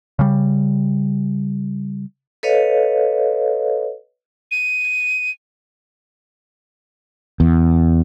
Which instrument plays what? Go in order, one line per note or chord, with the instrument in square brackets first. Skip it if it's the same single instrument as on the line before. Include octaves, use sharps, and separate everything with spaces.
[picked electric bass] C#3 G3
[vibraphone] A4 B4 C#5 D#5 F5
[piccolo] D#7
[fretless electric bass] E2